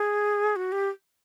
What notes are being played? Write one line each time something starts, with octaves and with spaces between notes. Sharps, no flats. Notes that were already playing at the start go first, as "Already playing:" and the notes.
Already playing: G#4
F#4
G4